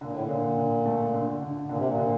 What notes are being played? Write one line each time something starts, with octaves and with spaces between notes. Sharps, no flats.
A#2 D3
A2
A#2
D3
D3
A3
D3
D3
A#2 D3
C3
A#2
D3